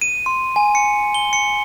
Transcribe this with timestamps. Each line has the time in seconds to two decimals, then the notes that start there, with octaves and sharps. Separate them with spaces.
0.01 D#7
0.26 C6
0.56 G#5
0.75 C#7
1.14 G7
1.33 C#7